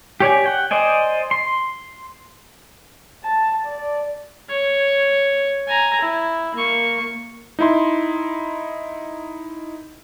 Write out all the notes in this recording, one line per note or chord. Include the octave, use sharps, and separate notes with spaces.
G4 C#5 D5 G#5
F#5 G5
C5 D5 D#5 G#5
C6
A5
D5
C#5
G#5 A#5
E4
A#3 C#6
D#4 E4 C6